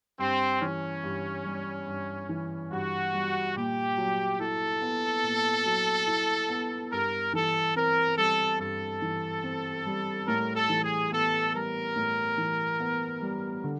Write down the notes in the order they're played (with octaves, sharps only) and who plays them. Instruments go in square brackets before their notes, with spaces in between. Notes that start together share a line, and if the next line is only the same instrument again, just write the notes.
[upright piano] G2 [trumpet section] C4
[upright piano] E3 [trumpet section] C#4
[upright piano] G2
G3
G2
E3
[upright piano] G2 [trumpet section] F#4
[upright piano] G3
[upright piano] A#2 [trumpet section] G4
[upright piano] F#3
[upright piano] E4 [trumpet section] A4
[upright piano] B3
A#2
F#3
E4
B3
[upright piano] G2 [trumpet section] A#4
[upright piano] E3 [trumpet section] A4
[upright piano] C4 [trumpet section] A#4
[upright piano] G3 [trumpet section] A4
[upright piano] G2 [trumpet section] A4
[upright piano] E3
C4
G3
[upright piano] A2 [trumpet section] A#4
[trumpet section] A4
[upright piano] E3
[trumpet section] G#4
[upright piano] B3 [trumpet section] A4
[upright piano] G3 [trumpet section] A#4
[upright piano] A2
E3
B3
G3
D3